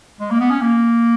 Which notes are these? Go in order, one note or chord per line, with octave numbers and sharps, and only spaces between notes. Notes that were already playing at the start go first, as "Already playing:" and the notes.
G#3
A#3
B3
C#4
A#3